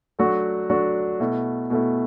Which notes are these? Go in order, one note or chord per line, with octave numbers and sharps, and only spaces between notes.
F#3 A3 D4 F#4
F#3 A3 D4 F#4
B2 A3 E4
B2 A3 E4